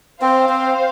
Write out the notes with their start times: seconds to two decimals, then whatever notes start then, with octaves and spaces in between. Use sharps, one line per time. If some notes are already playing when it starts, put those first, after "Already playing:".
0.21 C4 C5 F5
0.49 C4